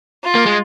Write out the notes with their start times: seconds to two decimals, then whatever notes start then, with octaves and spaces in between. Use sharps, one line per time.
0.24 F4
0.35 A#3
0.46 G#3